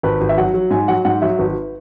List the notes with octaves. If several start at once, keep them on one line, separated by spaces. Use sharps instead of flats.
G#1 B4
G#1
E5
F#3 F#5
F#3
G#2 G#5
F#3 F#5
G#2 F#5
F#3 E5
G#1 B4